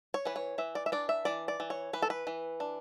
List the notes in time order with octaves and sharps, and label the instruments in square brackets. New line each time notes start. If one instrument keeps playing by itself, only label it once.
[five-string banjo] C#5
E3 B4
C#5
E3 E5
D5
E5
D4 D5
E5
E3 D5
D5
E3
C#5
E3 B4
A4
B4
E3
D4